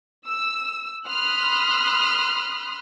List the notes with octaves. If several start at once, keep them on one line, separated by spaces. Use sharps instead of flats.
E6
B5 C6 D#6 F6 F#6